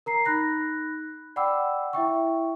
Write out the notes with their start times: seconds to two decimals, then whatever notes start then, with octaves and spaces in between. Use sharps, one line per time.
0.06 A#4 A#5 C7
0.25 D#4 B5 F#6 A#6
1.36 D5 F#5 G5 B5 D6 E6
1.93 E4 E5 G5 C#6